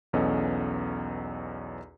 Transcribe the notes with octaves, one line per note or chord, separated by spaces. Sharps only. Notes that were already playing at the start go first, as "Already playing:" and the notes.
B1 E2 B3 C#4 A4 D#5